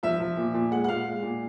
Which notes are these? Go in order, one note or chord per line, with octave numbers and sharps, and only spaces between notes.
F3 E5
F3
A#2
A#2
G#3 F#5
F#5
A#2 F5
G#3
A#2